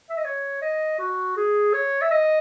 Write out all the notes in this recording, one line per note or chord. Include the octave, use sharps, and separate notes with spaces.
E5
D#5
C#5
D#5
F#4
G#4
C#5
E5
D#5